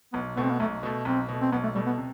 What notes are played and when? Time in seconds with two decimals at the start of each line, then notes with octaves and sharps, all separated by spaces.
0.13 B1 B3
0.36 B2 A3 B3
0.44 C4
0.51 B3
0.60 B1 A3
0.83 B2 A3
1.05 B1 C4
1.29 B2 A3
1.41 C4
1.52 B1 B3
1.64 A3
1.75 B2 G3 A3
1.87 B3
1.98 C3